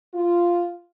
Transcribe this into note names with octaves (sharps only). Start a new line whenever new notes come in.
F4